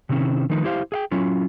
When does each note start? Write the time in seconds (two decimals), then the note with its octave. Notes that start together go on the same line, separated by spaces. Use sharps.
0.09 C3 D#3 C4 C#4 E4
0.50 D#3 F3 A3 D#4 B4
0.64 E4 G4 C5 D#5 F5
0.92 G#4 F5 G5
1.11 F#3 C#4 E4 F4